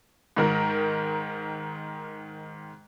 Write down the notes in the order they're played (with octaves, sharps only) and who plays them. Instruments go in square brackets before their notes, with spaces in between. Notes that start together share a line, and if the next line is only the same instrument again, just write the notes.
[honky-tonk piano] G#2 D#3 A#4